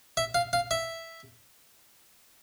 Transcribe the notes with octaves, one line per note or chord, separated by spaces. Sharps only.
E5
F5
F5
E5